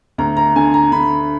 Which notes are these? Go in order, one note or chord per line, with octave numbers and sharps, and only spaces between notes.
D2 A#5
A#5
D3 G#5
A#5
D3 B5